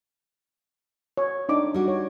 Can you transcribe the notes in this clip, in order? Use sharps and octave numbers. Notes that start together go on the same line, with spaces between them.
C#5
D4 D#4 D6
G3 F#4
C#5